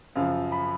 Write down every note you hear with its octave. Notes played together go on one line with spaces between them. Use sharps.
F#2 C#3 F3 F5
B5